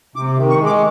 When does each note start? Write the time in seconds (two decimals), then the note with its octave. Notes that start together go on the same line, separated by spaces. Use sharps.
0.16 C3 D6
0.37 D#3
0.50 C#6
0.60 G#3
0.66 D6